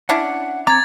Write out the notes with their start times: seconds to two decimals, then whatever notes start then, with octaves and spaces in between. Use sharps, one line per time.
0.09 C#4 D4 E4 F#5
0.67 C4 A#5 D6 G#6 A6